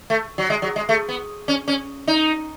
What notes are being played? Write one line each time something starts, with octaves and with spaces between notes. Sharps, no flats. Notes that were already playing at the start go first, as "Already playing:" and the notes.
A3
F#3
G#3
F#3
G#3
A3
B3
C#4
C#4
D#4